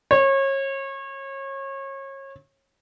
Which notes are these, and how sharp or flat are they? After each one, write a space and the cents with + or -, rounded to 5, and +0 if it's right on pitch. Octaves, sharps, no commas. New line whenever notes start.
C#5 -30